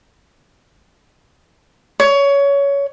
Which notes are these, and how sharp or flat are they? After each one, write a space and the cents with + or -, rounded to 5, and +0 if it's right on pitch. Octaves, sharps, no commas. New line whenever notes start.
C#5 +20